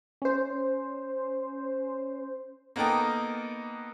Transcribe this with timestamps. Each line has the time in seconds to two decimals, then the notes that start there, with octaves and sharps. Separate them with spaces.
0.22 C#4 C5
2.76 A#3 B3 D#4 A4 A#4 G5